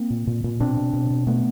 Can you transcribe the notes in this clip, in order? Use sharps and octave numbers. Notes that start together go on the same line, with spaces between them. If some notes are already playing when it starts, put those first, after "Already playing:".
Already playing: A#3 C4
A#2
A#2
A#2
B2 C4 D4
B2
B2
B2
B2 A3 B3